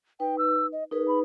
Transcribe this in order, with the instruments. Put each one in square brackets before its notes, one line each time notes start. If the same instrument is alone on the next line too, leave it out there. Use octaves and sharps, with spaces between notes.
[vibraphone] D#4 B4 [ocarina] G5
[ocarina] E6
D#5
[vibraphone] D#4 G#4 B4 [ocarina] A#4
[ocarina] B5